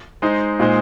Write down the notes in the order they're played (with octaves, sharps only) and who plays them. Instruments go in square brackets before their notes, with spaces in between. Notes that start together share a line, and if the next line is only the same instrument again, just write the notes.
[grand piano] G#3 D#4 C5 D#5
A#2 G#3 D#4 C5 D#5